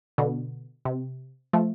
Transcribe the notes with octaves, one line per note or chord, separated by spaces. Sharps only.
B2 D3
C3
F3 A3